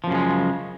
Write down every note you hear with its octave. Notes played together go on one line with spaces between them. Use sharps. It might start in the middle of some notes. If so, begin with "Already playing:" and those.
F#2 C#3 F3 G#3